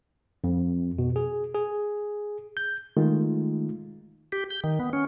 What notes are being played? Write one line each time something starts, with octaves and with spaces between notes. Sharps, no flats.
F2
B2
G#4
G#4
G6
D#3 G#3 A3 D#4 F4
G4
G6
D#3
B3
C#4